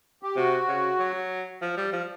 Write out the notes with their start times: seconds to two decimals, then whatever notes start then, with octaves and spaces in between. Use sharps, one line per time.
0.22 G4
0.36 C3 F#4
0.68 C#3
0.99 F#3
1.62 F3
1.77 G3
1.93 F3